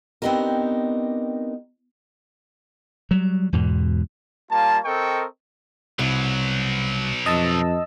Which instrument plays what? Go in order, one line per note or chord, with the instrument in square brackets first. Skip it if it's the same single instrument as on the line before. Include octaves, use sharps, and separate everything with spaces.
[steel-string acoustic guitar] B3 C4 D4 D#4 G4 A#4
[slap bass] F#3 G3
E2 G#2 B2
[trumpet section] G3 A#3 F4 A5
C4 A4 A#4 D#5 G5 C#6
[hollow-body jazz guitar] C2 [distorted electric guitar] B2 F#3
[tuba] F2 [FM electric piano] D#5 A5 E6